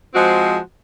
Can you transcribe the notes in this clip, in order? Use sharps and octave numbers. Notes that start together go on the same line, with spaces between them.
F3 G#3 C4 F#4